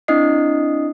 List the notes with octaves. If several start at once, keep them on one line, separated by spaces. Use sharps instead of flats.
C4 D4 E4 D#5 D#6 C7